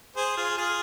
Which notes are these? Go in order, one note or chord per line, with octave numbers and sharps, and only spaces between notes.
G#4 C5
F4 G#4
F4 G#4